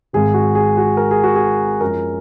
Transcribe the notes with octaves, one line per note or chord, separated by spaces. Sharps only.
G#1 G#2 D#3 G#4
F#4
G#4
F#4
A#4
G#4
F#4
G#4
F#2 F3 G#3 A#4